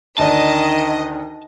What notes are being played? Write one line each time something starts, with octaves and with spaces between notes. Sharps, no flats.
D2 D#3 D4 D#5 A5